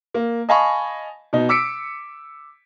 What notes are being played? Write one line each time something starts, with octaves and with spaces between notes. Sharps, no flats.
A#3
D#5 F5 G#5 A5 B5 C#6
B2 D#4
D6 E6 B6 C#7 D7